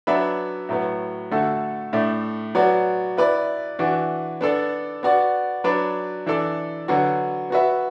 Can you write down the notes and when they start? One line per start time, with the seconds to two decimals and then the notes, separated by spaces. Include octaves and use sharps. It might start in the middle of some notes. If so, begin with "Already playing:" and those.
0.07 F#3 B3 D4 B4 E5
0.69 A2 F#3 B3
1.31 D3 A3 F#4 A4
1.93 A2 A3 D4
2.55 F#3 B3 F#4 D5
3.17 B3 E4 B4 D5
3.79 E3 D4 F#4
4.41 B3 D4 A4 D5
5.03 B3 F#4 D5
5.64 F#3 D4 B4 D5
6.26 E3 D4 A4 D5
6.88 D3 F#3 B3 F#4
7.50 B3 F#4 B4 E5